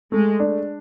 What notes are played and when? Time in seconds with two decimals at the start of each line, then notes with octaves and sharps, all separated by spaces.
0.12 G#3 A3
0.40 D4